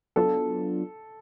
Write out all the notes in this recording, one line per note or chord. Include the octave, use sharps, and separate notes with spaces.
F#3 B3 D4 F4 A4